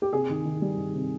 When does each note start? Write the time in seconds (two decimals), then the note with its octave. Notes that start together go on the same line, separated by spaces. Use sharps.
0.02 G4
0.13 C3 G#4
0.29 D#3
0.45 D#3
0.61 G3
0.78 D#3
0.94 C3